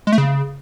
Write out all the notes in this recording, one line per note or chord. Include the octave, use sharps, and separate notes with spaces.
G#3
A3
C#3